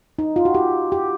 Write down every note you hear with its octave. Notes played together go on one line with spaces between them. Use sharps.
D#4
F4
F#4
G4
G4